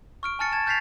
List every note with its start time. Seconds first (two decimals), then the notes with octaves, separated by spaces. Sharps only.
0.23 C#6 F6 D7
0.39 G#5 A5 F6 A6 C#7
0.52 A5 G#6 A6 E7
0.66 F6 G6 A6 B6 C7 F7